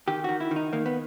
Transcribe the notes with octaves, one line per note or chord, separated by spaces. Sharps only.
D#3 G4
D#3 F#4
E4
D#3
D#4
D#3 A#3
B3